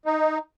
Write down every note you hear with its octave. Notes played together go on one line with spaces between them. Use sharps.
D#4